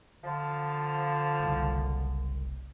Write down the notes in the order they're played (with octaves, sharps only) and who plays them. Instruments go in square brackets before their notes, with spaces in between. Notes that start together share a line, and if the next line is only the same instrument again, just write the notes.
[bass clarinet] D3 [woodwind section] F3
[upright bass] F#1 C2